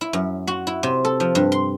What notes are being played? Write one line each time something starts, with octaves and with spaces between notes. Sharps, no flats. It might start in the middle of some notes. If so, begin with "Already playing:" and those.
E4
F#2
F#4
E4
C3
A4
F3
G2
C6